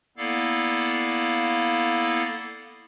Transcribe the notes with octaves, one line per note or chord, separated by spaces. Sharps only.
A#3 B3 E4 A4 D5 F5